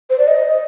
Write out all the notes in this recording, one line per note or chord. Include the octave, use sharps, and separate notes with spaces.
C5
D5
D#5